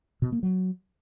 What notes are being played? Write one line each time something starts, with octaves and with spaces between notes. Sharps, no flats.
B2
A#3
F#3